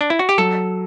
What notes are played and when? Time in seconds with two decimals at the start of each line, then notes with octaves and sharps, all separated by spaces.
0.01 D4
0.10 E4
0.19 F#4
0.29 G4
0.38 F#3 A4